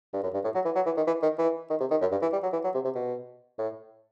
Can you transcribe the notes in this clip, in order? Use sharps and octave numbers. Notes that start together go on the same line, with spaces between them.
G2
F#2
G2
A2
F#3
E3
F#3
E3
D#3
E3
D#3
E3
D#3
C3
D#3
F#2
G2
E3
G3
F#3
E3
F#3
C3
C3
B2
A2